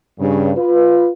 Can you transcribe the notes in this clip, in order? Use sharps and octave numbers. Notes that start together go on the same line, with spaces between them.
G2 C#3
F4 B4